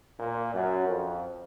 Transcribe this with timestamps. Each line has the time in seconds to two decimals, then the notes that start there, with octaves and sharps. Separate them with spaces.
0.19 A#2
0.54 F#2
0.88 F2